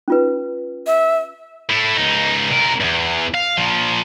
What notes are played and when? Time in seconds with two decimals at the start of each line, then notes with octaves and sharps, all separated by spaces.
0.08 C#4 F4 B4
0.87 E5
1.69 A3 E4
1.97 C#2 D#4
2.51 C3 A#4
2.80 E2 G2
3.35 F5
3.58 A#2 F3